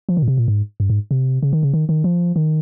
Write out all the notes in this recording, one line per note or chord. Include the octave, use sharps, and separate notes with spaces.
F3
D#3
A#2
C3
A#2
G#2
G2
G#2
C3
C#3
D#3
C#3
D#3
D#3
F3
D#3